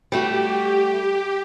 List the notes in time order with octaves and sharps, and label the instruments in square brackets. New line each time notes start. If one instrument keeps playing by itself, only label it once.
[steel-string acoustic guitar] G3 A3 F#4 [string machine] G4